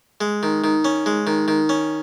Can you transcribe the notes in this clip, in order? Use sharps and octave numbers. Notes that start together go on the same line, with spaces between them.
G#3
D#3
D#3
C#4
G#3
D#3
D#3
C#4